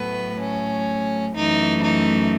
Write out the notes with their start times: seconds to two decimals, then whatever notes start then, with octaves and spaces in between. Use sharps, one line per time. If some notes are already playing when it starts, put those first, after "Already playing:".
Already playing: A2 F#3 A3 B3 B4
0.40 C#4
1.35 F#2 E3 A3 D#4
1.83 D#4